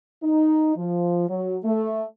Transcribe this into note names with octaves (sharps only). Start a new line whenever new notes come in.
D#4
F3
F#3
A3